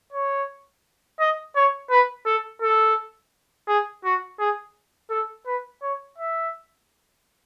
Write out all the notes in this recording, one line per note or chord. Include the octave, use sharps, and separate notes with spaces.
C#5
D#5
C#5
B4
A4
A4
G#4
F#4
G#4
A4
B4
C#5
E5